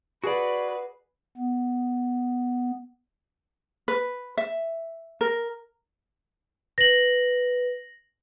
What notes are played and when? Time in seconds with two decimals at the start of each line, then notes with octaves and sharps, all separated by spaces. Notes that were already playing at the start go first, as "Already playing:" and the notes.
0.24 F#4 G#4 B4 D5 F#5
1.37 B3
3.88 B4
4.38 E5
5.21 A#4
6.78 B4 A#6 F#7